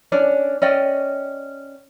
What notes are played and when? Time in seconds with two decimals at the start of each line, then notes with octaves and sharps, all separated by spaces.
0.12 C#4 D4 D5
0.62 C#4 D5 D#5 G5